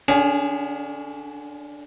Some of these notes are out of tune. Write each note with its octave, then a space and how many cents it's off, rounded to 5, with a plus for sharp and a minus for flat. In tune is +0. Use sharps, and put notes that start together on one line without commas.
D3 +0 C#4 +35 G#4 -25